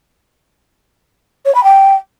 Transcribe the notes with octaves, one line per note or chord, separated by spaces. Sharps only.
C#5
B5
G5